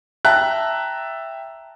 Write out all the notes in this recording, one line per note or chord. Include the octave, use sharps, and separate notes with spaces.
E5 G5 A5 A#5 F#6